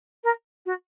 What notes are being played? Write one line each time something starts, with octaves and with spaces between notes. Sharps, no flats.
A#4
F#4